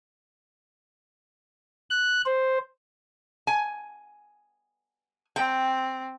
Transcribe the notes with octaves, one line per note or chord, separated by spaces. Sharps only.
F#6
C5
G#5
C4 G5